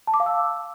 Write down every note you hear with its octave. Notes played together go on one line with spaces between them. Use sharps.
A5
D6
F5
E6